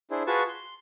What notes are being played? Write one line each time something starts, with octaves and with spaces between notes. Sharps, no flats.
D4 E4 G#4 C5
F4 F#4 G#4 B4 A5 C#6
C6